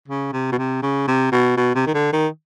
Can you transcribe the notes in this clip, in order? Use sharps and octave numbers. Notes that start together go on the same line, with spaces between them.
C#3
C3
B2
C3
C#3
C3
B2
B2
C3
D#3
D3
D#3